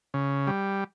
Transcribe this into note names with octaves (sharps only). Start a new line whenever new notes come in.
C#3
G3